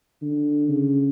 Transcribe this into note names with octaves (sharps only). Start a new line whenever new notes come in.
D3
C#3